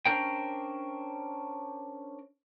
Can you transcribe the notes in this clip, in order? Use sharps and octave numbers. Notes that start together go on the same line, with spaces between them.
C#4 D4 A#4 C5 G5